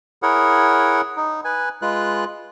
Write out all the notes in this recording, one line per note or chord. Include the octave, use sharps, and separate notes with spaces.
E4 G#4 A#4 C#5 F#5
D#4
B4 G#5
G#3 F4 B4 F#6